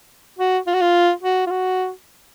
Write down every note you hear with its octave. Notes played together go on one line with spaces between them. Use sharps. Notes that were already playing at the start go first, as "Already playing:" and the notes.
F#4
F4
F#4
F4
F#4
F4
F#4